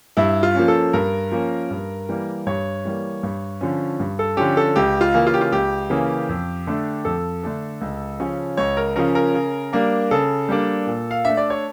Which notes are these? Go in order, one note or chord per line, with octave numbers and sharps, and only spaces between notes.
G2 E4
F4
F3 A#3 C#4
A4
G2 A#4
F3 A#3 C#4
G2
E3 G3 A#3
G2 C#5
E3 G3 A#3
G2
D3 F3 C#4
G2
A4
D3 F3 C#4 G4
A4
C#2 G4
F4
C#3 E3 A#3 C#4
F4
G4
F4
C#2 G4
C#3 E3 A#3 C#4
F2
D3 A3 D4
F2 A4
D3 A3 D4
C#2
C#3 F3 C#4
C#2 C#5
A#4
C#3 F3 C#4 A#4
A#4
C#3
G3 A#3 D4
C#3 A4
G3 A#3 D4
A#2
F5
A3 D4 E5
D5
C#5